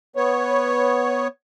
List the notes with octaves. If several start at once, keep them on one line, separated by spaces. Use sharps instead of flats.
B3 C#5